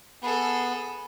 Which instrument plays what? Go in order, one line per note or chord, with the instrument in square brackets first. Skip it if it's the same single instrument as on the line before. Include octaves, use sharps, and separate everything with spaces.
[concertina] B3 [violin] G#4 A4